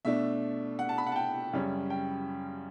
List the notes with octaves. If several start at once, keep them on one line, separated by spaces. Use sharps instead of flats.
B2 A3 D4 E5
F#5
A5
B5
F#5
A5
G5
F#2 C#3 G3 C#4
G5